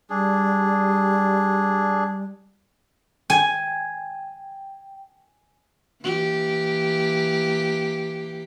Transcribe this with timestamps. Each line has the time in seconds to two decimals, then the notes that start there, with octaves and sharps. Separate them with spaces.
0.10 G3 D4 G#4
3.30 G5 G#5
6.03 E3 A#3 G4